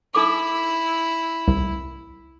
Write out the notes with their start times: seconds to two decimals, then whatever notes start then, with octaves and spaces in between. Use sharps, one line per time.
0.15 D#4 E4 A4 D6
1.48 C2